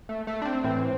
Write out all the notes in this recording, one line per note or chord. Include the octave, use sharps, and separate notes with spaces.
A3
A3
D4
C4
A2 E3 C4